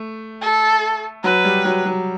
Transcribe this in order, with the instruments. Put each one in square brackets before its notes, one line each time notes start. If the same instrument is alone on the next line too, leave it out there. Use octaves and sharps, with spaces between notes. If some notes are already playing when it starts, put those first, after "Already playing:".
Already playing: [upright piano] A3
[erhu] A4
[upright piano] F#3 [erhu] B4
[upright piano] G3
F#3
F#3